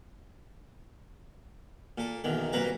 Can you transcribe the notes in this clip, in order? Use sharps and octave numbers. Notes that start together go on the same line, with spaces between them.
A#2 A4
B1 E2 D#3
C2 A#2 F#3 B4 A#5